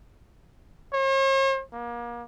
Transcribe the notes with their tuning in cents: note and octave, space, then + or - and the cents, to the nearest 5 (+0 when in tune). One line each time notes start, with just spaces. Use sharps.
C#5 -45
A#3 +35